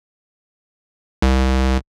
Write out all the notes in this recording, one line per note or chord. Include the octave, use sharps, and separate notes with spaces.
C2